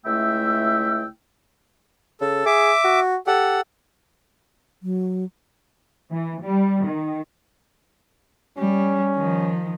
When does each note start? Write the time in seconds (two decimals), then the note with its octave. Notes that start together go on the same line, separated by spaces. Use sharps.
0.05 C#2 A3 E4 E5 G5 E6
2.21 C#3 A4
2.46 G#4 E5 D6
2.84 F#4
3.27 G4 A4 F#5
4.83 F#3
6.11 E3
6.42 G3
6.87 D#3
8.58 G3 C#4
9.16 D#3 F3